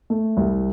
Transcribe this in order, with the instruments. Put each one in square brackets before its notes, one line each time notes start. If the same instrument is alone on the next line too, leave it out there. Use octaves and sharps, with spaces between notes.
[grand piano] A3
C2